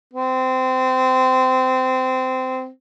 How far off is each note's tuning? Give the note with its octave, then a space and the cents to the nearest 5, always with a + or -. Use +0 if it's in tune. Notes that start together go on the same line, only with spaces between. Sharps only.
C4 -20